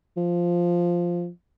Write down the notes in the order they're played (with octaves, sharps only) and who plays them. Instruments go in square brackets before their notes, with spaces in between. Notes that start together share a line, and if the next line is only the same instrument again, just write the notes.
[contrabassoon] F3